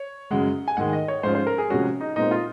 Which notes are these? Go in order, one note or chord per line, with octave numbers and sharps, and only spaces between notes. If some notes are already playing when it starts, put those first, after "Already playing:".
Already playing: C#5
F#2 C#3 G#3 F#5
G#5
G#2 D#3 G#3 F#5
D#5
C#5
G#2 F3 G#3 C#4 F4 C5
C5
A#4
G#4
C3 F3 G#3 C#4 F#4
D#4
A#2 G#3 C4 D#4
F4